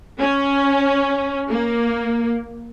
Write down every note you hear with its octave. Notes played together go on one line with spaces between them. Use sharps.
C#4
A#3